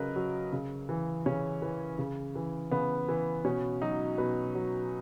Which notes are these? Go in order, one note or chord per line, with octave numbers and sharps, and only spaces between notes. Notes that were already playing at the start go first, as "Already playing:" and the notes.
Already playing: C#3 F#3 A#4 B4 D#5
F#3
C#3
E3
C#3 C#4
E3
C#3
E3
C#3 B3
E3
B2 C#4
F#3 D#4
B2 B4
F#3